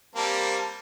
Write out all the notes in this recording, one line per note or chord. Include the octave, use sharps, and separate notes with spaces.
G3 A#3 C4 A5